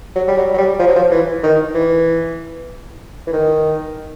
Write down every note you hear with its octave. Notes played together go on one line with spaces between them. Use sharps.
F#3
G3
F#3
F#3
G3
F3
F#3
F3
E3
D#3
E3
E3
D#3